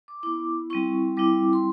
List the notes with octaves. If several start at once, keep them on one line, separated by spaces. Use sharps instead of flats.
D6
B3 E4 D6
G3 C4 E4 C#6
G3 C4 E4 D6
C6